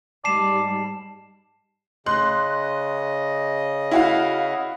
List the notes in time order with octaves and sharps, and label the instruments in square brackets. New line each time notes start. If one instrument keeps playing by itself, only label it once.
[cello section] G#2 G3 G#3 [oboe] D5 [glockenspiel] A5 C7 E7
[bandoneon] C#3 D#5 [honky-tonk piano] C6 F#6
[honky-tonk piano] E4 F#4 F5